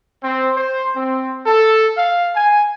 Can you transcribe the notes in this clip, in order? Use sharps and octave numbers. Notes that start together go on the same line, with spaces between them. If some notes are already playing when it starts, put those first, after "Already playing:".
C4
C5
C4
A4
F5
G#5